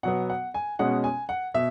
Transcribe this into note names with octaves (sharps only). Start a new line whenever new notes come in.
B2 F#3 B3 F#5
F#5
G#5
B2 G#3 C#4 F#5
G#5
F#5
B2 E5